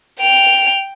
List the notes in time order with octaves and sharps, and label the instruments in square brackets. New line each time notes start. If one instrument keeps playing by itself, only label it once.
[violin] G5 F7